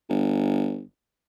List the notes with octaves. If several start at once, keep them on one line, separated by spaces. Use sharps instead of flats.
G1